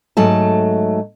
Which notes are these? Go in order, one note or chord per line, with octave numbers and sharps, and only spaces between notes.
G#2 F#3 A3 A5